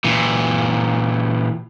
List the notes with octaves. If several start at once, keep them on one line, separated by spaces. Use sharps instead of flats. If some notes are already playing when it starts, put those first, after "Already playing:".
A#2 E3